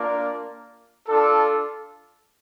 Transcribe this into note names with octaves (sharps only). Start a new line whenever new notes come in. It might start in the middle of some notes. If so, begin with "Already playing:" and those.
Already playing: A#3 D4 F4 A#4 D5
D4 F4 A4